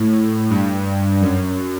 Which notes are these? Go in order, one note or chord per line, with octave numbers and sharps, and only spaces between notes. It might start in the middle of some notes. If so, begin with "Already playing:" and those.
Already playing: A2
G2
F#2